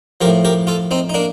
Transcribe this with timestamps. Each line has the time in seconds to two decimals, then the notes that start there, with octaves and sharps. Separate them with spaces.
0.21 F3 G4 A#4
0.25 A2
0.45 G4 A#4
0.67 F4 A4
0.91 C4 D#4
1.10 D#4
1.14 A#3 D4